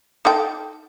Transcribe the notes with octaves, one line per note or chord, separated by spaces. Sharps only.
D#4 A4 G5